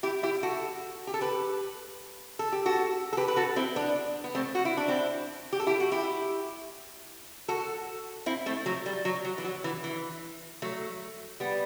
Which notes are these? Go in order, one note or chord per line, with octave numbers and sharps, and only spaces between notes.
E4 G4
E4 G4
F#4 A4
G4
A4
G4 B4
A4
G4
F#4 A4
A4
G4 B4
B4
F#4 A4
C4 E4
B3 D4
B3
A3 C4
F#4
E4
D4
C4 E4
G4
A4
E4 G4
F#4
E4 G4
F#4 A4
C4 E4
A3 C4
F#3 A3
G3
F#3
F#3
E3
F#3
E3
E3
F#3 A3
G3 B3